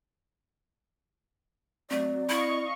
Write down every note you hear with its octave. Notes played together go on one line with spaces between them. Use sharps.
F#3 A3 C4 D5
E4 D#5 F5 C#6